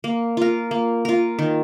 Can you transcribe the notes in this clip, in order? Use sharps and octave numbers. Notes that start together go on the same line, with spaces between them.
A#3
F4 A#4
A#3
F4 A#4
D#3